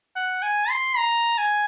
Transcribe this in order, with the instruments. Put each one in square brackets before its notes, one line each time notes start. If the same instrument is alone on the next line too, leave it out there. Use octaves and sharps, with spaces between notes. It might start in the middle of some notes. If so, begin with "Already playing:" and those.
[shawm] F#5
G#5
C6
A#5
G#5